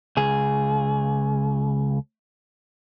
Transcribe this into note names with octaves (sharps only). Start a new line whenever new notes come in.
C#2 G#4